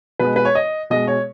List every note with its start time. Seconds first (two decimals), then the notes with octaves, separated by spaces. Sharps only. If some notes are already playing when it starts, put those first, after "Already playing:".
0.19 B2 G#3 B4
0.36 B4
0.45 C#5
0.55 D#5
0.90 B2 G#3 D#5
1.07 C#5